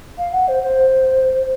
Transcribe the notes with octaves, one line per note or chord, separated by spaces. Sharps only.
F5
F#5
C5
C5